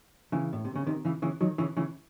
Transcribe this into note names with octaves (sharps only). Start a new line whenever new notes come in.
C#3 E3
A2
C3
C#3
C3 D#3
C#3 E3
C#3 E3
D#3 F#3
C#3 E3
C#3 E3